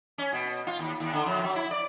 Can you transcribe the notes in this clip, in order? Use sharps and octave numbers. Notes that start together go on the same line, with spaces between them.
C#4
B2
F4
D#2
D#2
D3
F2
F#3
E4
D5